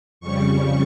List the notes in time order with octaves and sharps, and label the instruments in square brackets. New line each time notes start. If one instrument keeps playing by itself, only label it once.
[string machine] F2 C#3 G3 C#6